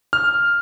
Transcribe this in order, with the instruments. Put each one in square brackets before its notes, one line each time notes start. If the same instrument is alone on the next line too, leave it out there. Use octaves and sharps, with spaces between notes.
[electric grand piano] F6